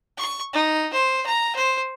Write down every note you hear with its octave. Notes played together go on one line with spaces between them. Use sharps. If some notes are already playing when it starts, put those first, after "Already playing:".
C#6
D#4
C5
A#5
C5